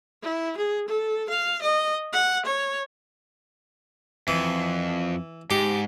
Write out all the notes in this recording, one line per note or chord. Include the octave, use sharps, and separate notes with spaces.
E4
G#4
A4
F5
D#5
F#5
C#5
F2 E3
G#2 G4